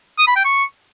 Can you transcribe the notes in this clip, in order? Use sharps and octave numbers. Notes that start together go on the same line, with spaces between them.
D#6
B5
G5
C#6